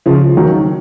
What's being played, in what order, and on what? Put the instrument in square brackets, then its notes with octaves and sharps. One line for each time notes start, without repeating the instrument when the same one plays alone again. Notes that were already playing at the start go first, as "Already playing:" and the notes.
[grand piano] C#3 F3
D#3 F#3